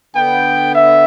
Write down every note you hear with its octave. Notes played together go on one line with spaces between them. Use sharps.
D3 B3 G5
E5